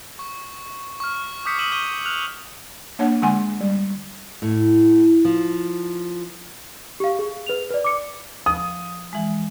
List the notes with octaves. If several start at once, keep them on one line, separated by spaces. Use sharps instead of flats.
C#6
C#6 F6
D6 D#6 G6 B6 C#7
C#6 D#6 E6 D#7 E7 F#7
C#6 G6 D#7 G7
F6 F#6 F7
A#3 D4 C#5 F#5
D3 G#3 F#5 G#5 C6
G3
A2
F3
G4 F5
G#4
B4 F7
B4 D5
D6 C#7
F3 D#6
E3 G#3